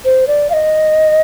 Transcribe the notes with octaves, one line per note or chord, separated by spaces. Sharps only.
C5
D5
F5
D#5